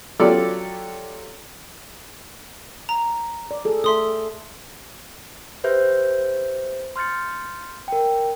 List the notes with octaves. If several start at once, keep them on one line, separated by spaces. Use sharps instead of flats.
F#3 F4 G4 A4 D5
A#5
D5
G#4 A4
A3 A4 E5 C6 D#6
G4 B4 C5 E5 G6
C6 F6 G6 A6 C#7
A#4 G5